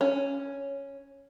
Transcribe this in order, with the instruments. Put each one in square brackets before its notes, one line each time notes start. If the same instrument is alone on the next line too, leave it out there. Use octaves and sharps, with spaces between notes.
[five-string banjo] C#4